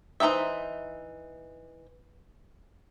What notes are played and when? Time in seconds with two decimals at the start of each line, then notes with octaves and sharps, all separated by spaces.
0.20 E3 C#4 D#4 C5 E5